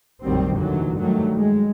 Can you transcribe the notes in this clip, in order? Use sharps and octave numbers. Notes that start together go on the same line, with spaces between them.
F1 A#1 D#3 F#3 G3 C4
D#2 A#2 D3 E3 F#3
G2 D#3 F#3 G3 A3
G#3